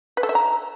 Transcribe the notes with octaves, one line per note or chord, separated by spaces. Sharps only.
B4
A4
E5
A#5